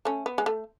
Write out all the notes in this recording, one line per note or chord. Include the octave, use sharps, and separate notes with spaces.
A3 C#4
B3
G#3
A3